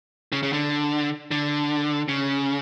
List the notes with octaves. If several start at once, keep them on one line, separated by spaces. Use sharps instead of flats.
C#3
C#3
D3
D3
C#3